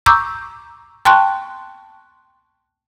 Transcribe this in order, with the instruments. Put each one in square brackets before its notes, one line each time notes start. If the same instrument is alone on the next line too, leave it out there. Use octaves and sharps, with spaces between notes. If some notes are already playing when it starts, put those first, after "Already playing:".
[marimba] A#5 C#6 D6 E6 G6
G5 A5 C6 C#6 F#6